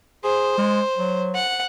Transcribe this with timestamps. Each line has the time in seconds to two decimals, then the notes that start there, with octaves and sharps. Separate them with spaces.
0.24 G#4 C5
0.58 G#3
0.97 F#3
1.35 F#5